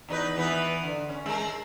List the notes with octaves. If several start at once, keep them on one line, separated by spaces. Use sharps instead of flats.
E2 D#4 B4
E3 B3 B4
D3
C#4
G#3 A#4